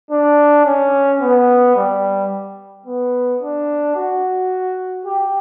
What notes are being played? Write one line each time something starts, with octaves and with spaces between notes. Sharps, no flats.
D4
C#4
B3
G3
B3
D4
F#4
G4